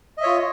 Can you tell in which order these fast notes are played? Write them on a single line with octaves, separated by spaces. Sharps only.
D#5 E5 C#5 F4